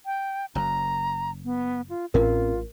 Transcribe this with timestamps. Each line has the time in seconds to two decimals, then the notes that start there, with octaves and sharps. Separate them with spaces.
0.06 G5
0.55 F#1 F#2 A#5
1.45 B3
1.89 F4
2.14 A1 A2 C4 C#4 F4 A#4